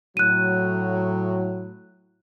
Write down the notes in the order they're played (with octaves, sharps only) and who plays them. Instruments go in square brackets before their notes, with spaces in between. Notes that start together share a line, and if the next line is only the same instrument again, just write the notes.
[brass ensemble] A2 F#3 [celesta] F#6 D#7